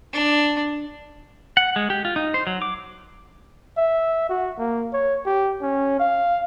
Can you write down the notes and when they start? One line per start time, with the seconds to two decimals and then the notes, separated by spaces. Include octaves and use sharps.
0.13 D4
1.57 F#5
1.76 G#3
1.90 G4
2.05 F4
2.16 D#4
2.34 C5
2.47 F#3
2.62 D6
3.78 E5
4.29 F#4
4.58 A#3
4.93 C#5
5.25 G4
5.62 C#4
6.00 F5